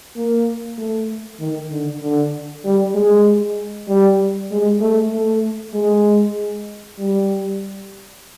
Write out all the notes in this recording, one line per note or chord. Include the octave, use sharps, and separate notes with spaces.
A#3
A3
D#3
D3
D3
G3
G#3
G3
G#3
A3
A3
G#3
G3